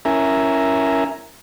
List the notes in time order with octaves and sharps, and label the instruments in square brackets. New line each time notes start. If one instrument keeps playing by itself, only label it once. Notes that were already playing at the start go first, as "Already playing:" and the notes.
[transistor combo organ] C#4 E4 A#4 E5 G#5 A#5